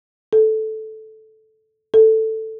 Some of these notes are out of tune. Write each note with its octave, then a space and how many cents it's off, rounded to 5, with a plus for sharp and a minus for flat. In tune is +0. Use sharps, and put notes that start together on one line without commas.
A4 -10
A4 +5